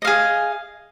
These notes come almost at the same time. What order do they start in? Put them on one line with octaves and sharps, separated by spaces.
D#5 F5 G#4